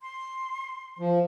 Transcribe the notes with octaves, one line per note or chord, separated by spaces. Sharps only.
C6
F3